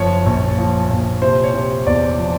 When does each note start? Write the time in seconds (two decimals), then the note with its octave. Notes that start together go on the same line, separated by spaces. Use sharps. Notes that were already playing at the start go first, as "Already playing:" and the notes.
Already playing: F#1 F3 C#5
0.26 A#1
0.58 F3
0.90 A#1
1.22 C3 C5
1.44 C#5
1.54 C3
1.86 E2 D5
2.18 F3